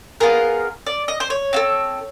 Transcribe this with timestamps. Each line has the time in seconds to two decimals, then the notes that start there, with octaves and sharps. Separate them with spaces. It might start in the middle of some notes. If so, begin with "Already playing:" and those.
0.20 B3 D4 F4 G#4 A#4
0.86 D5
1.08 D#5
1.20 C5
1.30 C#5
1.53 C4 F4 A4